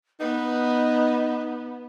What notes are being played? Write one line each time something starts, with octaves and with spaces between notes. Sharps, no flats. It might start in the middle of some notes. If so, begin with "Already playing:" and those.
B3 D#4 B4